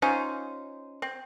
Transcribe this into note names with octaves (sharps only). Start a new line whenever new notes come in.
C#4 D#4 F4 C5
C4